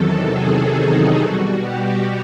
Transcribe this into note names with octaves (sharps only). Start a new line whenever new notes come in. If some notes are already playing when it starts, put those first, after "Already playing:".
Already playing: E2 C3 D#3 F#3 A4
G#4
D#4
B2 G3 F#4
G4